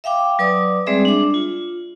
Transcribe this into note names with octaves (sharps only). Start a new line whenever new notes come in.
E5 F5 G5 D6
F#3 B4 D5 D6 D#6
G3 G#3 C4 G#4 D5 E5
D4 D6
F4